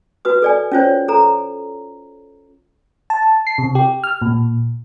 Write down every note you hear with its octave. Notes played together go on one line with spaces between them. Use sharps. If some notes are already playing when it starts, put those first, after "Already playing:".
F#4 B4 D#6
A4 D5 G#5
C#4 F4 C5 C#5
A4 A#5
A5
C7
C3
G4
F6
A#2